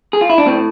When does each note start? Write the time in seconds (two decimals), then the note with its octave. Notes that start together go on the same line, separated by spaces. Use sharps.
0.13 G#4
0.21 F4
0.30 E4
0.38 D4
0.46 A2 C4